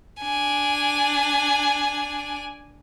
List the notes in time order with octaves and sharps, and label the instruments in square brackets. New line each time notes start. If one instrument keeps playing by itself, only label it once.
[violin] D4 G#5